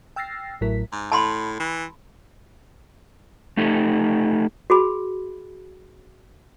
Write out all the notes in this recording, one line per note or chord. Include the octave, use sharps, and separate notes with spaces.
G5 E6 F6 A6 A#6 C7
A1 A2 F#3 E4 A#4 B6
G#2
A2 A5 B5 C6
E3
A3 D#4 G4 A4
F#4 G#4 B5